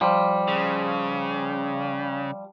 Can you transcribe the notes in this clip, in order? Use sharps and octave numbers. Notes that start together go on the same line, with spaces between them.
F3 G3
C#3